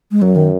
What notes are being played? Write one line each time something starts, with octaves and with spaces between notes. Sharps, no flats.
G#3
F#2 F#3
D#3